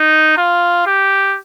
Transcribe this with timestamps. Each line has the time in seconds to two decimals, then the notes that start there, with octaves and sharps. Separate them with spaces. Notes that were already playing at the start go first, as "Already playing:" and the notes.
Already playing: D#4
0.38 F4
0.86 G4